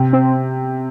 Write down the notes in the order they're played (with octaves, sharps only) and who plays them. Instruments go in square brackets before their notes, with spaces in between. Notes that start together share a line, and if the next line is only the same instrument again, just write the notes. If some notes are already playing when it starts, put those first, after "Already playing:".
Already playing: [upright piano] C3
[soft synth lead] C4